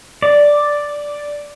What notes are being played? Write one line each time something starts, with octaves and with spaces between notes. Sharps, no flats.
D5